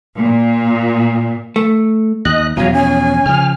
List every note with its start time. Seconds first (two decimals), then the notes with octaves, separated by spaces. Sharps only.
0.18 A#2
1.56 A3
2.25 D#2 D#5 F#6
2.57 E2 B2 F3 F#3 F5 G#5 A#5
2.73 C#4 G#5
3.26 C#3 F3 F6